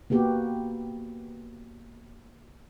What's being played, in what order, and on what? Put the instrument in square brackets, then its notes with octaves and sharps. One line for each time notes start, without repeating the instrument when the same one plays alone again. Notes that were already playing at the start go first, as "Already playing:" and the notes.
[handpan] A#3 B3 F#4 G4